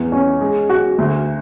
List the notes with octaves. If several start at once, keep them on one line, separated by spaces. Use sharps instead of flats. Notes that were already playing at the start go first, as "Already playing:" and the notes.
Already playing: E2
C#4
G#3
F#4
D2